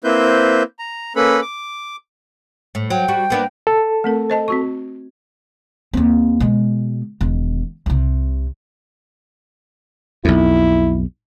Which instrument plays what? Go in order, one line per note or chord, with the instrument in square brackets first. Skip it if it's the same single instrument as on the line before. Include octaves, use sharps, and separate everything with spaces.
[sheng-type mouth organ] A#3 C4 E4 B4 C5 G6
A#5
A#3 C#4 A4 B4 B5
D6
[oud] A2
[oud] F#3 [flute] G5
[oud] G3 F#4
A#3 B3 D4
[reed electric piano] A4
[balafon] A3 C4 A#4
C5 D#5 A5
C4 F#4 C#6
[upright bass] D#2 C4
B2 G#3
E1 D#3
C2 C3
[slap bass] B1 F2 [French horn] E4